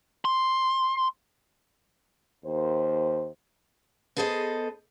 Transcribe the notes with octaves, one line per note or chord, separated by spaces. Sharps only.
C6
D#2 C5
B3 G#4 A4 C5 D5 D#5